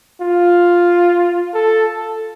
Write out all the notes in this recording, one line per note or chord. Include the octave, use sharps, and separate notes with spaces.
F4
A4